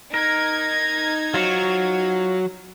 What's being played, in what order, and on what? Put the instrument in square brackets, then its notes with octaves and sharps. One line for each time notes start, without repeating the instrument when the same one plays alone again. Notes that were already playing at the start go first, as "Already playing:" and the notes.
[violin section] D#4 G#6 [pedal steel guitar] A#4
[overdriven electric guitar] F#3 [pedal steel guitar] F4 C5 C#5